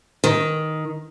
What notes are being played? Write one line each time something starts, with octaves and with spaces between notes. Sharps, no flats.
D#3